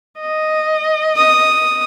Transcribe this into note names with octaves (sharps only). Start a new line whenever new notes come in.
D#5
D#6